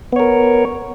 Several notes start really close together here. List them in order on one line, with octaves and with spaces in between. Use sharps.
B3 C#5 A#4